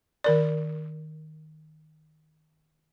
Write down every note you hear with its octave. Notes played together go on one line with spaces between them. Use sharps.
D#3 A#4 D5